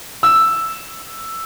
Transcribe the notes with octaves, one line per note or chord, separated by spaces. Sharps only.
E6